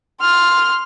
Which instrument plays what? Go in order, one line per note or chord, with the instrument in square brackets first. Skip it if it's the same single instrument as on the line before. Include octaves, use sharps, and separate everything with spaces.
[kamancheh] C6 F6